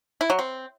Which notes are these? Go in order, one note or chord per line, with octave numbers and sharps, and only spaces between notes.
E4
F#3
C4